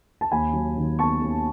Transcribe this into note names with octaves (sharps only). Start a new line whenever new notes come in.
A5
D#2 G#5 B5
F#3
D#3
B3 A5 C#6
D#2